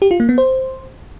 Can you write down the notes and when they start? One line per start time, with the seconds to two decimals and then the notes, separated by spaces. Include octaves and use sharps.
0.02 G4
0.11 F4
0.20 A#3
0.29 B3
0.38 C5